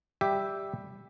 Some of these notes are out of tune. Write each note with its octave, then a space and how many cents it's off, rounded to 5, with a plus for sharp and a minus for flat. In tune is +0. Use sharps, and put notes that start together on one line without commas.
G3 +5 G4 +0 E5 +0